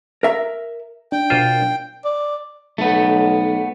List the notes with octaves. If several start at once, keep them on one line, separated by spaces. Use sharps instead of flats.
A#4 E5 A#5
D4 G5
B2 F4 A#4 C5 D5
D5
B1 A3 B3